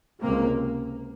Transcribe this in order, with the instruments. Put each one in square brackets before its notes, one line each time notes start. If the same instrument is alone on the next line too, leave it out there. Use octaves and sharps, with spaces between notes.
[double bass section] C#2 C3 A#3